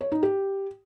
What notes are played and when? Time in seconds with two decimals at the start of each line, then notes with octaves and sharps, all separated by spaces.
0.01 C#5
0.12 D#4
0.23 G4